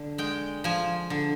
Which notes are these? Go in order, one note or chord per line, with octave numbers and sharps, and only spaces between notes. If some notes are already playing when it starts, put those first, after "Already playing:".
Already playing: D3
G#3 G5
F3 G#5
D3